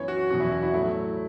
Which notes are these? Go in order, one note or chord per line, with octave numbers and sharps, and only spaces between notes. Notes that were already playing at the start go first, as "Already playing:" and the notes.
Already playing: F#2 E3 B3 C#5
F#4
E2 B2 F#3 C#4 F#4
E4
F#4
E4
A2 F#3 A3 E4